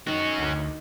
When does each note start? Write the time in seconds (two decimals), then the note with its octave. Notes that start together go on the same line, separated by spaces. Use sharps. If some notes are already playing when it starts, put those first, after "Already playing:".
0.07 D#3 C#4 F#4
0.38 D2